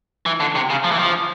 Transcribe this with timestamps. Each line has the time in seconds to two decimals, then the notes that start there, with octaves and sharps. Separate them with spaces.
0.26 E3
0.40 D3
0.55 C3
0.70 C#3
0.84 F3
0.92 E3
0.99 F3